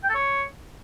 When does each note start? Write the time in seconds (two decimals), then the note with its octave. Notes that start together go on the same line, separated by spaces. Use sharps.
0.04 G5
0.09 A4
0.15 C#5